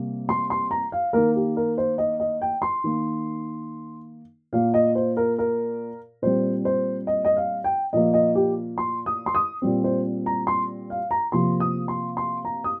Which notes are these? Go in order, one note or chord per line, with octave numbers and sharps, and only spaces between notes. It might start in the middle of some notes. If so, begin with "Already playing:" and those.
Already playing: C3 G3 A#3
C6
C6
A#5
F5
D#3 A#3 A#4
G4
A#4
C5
D#5
D#5
G5
C6
D#3 A#3
A#2 A#3 F5
D#5
C5
A#4
A#4
A#2 G3 C4 C5
C5
D#5
D#5
F5
G5
A#2 F3 A#3 D#5
D#5
G4
C6
D#6
C6
D#6
A#2 G3 C4
C5
A#5
C6
F5
A#5
C3 F3 A#3 C6
D#6
C6
C6
A#5
D#6